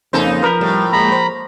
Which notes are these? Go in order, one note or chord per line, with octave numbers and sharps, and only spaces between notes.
F2 C#3 A#3 D#4 A4 C5
F3 A#4 B4 B5
A2 G3
G#3 A#3 A#5 B5
C5